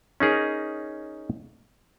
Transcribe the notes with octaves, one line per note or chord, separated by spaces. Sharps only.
C#4 D#4 G#4 A#4